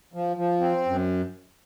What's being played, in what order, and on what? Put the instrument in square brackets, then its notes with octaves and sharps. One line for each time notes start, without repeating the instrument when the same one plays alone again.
[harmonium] F3
F3
C4
F#2